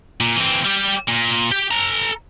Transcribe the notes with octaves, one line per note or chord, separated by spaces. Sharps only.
A#2
E3 C4
G3 G4
A#2
G4 G5
A4 A#5